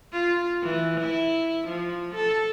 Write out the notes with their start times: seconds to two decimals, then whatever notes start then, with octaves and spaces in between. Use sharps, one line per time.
0.13 F4
0.62 E3
1.01 E4
1.68 F3
2.15 A4